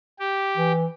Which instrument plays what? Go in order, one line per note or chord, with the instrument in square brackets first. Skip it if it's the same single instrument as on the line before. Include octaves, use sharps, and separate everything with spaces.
[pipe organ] G4
[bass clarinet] E3